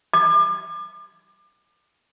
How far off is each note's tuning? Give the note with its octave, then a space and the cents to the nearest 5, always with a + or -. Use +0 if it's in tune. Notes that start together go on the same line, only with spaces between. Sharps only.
D6 +35